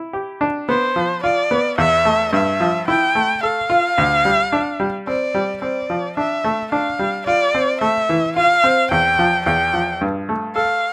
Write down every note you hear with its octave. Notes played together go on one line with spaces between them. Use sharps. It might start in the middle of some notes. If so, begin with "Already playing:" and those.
Already playing: E4
G4
D4
B3 C5
F3
F4 D5
B3
E2 E5
A3
G2 E5
F3
E4 G5
A3
A4 F5
F4
D2
G3
D4
G3
C4 D5
G3
C4 D5
F3
D4 E5
A3
D4 F5
G3
F4 D5
C4
A3 E5
E3
F4 F5
C4
E2 G5
F3
E2 G5
F3
G2
A3
A4 F5